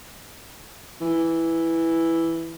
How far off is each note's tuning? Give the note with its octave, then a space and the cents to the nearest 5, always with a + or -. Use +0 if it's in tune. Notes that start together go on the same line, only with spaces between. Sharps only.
E3 +0